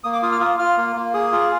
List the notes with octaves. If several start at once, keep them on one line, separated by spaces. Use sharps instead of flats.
A#3 D#6
D6
F4 D#6
F6
F4 D#6
F4 F6
A#3
A#3
G#4 D#6
F4